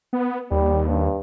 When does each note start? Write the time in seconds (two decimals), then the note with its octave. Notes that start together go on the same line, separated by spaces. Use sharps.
0.13 B3
0.51 D#2 G3
0.86 G2